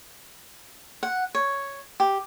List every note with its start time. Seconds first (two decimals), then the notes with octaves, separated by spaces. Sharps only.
1.03 F#5
1.35 C#5
2.00 G4